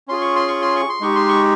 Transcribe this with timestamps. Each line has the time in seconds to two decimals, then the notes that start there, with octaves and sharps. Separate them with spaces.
0.08 C#4 F4 G#4 C6
0.21 C#6
0.36 C6
0.48 C#6
0.62 C6
0.76 C#6
0.89 C6
1.00 G#3 D#4 G4 C#6
1.16 C6
1.28 C#6